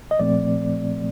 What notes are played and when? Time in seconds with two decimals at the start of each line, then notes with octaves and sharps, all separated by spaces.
0.11 D#5
0.19 A#2 F3 A3 C4 D5